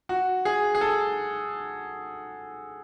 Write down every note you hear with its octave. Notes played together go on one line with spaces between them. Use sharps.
F#4
G#4
G#4
A4